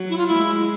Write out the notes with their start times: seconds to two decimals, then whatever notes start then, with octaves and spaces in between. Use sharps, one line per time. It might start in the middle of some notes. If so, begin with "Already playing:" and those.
Already playing: F#3
0.09 E4
0.18 F4
0.27 E4
0.34 G#3